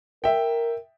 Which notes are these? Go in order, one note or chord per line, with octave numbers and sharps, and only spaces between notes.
A#4 E5 G5